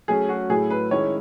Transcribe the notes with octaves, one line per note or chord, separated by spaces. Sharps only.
F#3 A3 C#4 G#4
F#4
A2 F#3 A3 E4 G#4
B4
D#3 G#3 C#4 E4 C#5